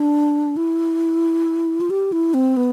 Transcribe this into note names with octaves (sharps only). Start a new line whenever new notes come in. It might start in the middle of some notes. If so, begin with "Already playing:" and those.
Already playing: D4
E4
F4
G4
E4
C4
B3